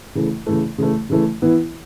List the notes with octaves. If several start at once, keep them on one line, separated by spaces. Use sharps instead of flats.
C#3 E3 A3
C#3 E3 A3
C#3 E3 A3
C#3 E3 A3
E3 B3 E4